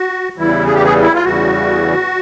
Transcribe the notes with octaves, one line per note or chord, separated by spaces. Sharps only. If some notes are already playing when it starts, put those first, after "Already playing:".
Already playing: F#4
E2 C#3 E3 G3 E4
G#4
G4
G#4
E4
F4
E2 C#3 E3 G3 F#4